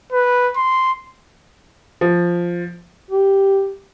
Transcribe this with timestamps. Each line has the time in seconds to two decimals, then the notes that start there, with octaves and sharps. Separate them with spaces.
0.12 B4
0.57 C6
2.01 F3
3.11 G4